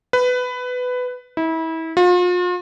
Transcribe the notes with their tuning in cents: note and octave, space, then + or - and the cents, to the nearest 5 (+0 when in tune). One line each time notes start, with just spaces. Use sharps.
B4 +15
E4 -30
F4 +40